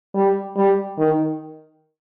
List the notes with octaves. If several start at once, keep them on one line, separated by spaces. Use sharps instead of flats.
G3
G3
D#3